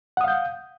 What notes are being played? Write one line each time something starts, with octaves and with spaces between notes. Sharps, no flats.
F5 F#5 D#6 G6